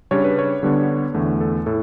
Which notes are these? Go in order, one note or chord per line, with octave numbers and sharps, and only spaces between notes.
C#3 G3 D4 C#5
B4
C#5
D3 G3 B3 D4
E2 D3 A3
A4
A2 A4